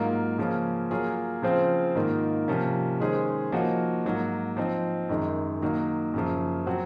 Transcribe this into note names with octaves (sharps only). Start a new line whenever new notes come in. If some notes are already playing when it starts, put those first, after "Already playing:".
Already playing: G#2 F#3 A#3 F4 A#4
C#3 F3 A#3 C#4 F4
F#3 A#3 F4 G#4 C#5
C#3 F3 C4 F4 C5
G#2 D#3 A#3 F4
C3 F3 A#3 C#4
D#3 G#3 C#4 G#4 C5
F3 A#3 D#4 F#4 C#5
G#2 F#3 A#3
F3 C4 D#4
F#2 D#3 G#3
D#3 F#3 A#3 D#4
F#2 C#3 F3
F#3 C4 F#4